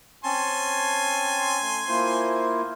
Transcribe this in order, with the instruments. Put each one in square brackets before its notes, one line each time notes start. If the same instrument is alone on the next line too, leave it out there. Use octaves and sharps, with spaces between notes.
[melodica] C4 C#4 A5 [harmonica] G#5 C6
[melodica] A3
[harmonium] A#3 E4 F4 [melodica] C5